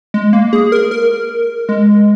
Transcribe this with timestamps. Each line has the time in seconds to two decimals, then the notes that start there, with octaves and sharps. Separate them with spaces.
0.14 G#3
0.33 A#3
0.53 G#4
0.72 A#4
0.91 A#4
1.69 G#3